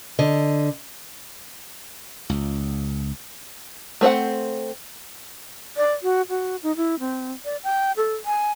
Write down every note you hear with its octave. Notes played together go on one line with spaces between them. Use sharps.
D3 D#5
C#2
A3 C4 C5 F#5
D5
F#4
F#4
D#4
E4
C4
D5
G5
A4
G#5